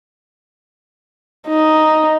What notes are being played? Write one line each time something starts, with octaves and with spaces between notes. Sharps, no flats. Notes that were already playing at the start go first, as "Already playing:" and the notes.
D#4